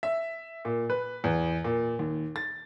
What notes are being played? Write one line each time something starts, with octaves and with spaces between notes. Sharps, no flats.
E5
A#2
B4
E2
A#2
D#2
A6